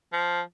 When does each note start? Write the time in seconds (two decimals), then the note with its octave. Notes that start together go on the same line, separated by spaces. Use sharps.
0.13 F3